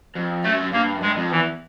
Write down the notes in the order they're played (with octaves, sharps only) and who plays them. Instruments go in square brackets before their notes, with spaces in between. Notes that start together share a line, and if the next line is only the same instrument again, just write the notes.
[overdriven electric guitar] F2
[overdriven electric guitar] F#2 [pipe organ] A3
[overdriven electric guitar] G2 [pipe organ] A#3
[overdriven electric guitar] F#2
[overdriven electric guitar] G2 [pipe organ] G#3
[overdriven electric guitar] F2
[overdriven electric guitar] E2 [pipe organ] E3